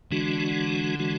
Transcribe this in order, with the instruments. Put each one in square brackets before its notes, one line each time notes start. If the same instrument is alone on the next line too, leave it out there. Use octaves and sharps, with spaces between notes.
[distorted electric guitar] D3 [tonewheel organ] E3 G#3 D4 F#4
[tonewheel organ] E3 G#3 D4 F#4